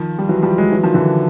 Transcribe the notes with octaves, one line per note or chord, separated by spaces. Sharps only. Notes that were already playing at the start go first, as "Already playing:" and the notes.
Already playing: D#3 F3
G3
E3 F#3
F3 G3
F#3 G#3
E3 F#3
D#3 F3
D3 E3